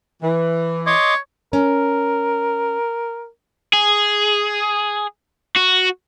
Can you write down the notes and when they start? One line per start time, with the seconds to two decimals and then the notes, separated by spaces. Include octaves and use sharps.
0.22 E3
0.86 C#5 D#5 C6 D6
1.53 C#4 A#4
3.73 G#4
5.57 F#4